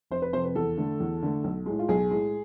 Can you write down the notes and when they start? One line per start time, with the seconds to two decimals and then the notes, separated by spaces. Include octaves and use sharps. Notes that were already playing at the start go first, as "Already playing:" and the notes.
0.11 F1 C5
0.22 B4
0.32 F2 C3 C5
0.44 B4
0.55 E2 A4
0.77 D3 A3
1.00 E2
1.23 D3 A3
1.44 B1
1.66 A2 G#3
1.79 F4
1.88 B1 G#4
2.11 A2 G#3